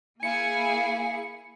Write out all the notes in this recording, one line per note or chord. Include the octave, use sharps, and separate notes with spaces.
A#3 E4 G#4 F5 G#5 C#7